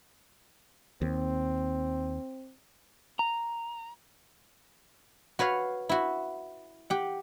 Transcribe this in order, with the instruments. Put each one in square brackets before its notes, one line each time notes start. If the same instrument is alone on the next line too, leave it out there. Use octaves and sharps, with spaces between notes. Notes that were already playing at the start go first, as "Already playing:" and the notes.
[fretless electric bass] D#2 [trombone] C4
[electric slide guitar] A#5
[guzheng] F#4 B4 C#5 F5
E4 F#4
G4 F#5